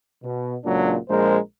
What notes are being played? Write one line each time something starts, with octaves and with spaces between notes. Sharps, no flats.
B2
C#2 A#2 F#3 D4
A#1 G#3 A#4 C5